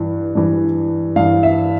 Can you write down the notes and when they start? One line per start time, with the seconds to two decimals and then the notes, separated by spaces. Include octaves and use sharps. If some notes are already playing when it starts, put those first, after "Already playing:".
Already playing: G2 E3
0.35 G2 E3
1.16 G2 E3 F5
1.43 E5